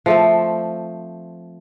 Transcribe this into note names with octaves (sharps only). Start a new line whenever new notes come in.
F3 A3 C4